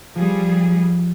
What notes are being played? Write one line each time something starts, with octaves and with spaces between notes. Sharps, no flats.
F3 G3 G#4